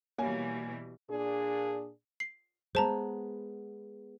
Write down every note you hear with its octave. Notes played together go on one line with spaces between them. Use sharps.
B2 E3 G3 A#3 C#5 G#5
A#2 D4 G#4
C7
G#3 B3 C5 A5 A#5